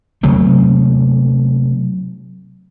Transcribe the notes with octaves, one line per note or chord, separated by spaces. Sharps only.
C3 F#3 A3 A#3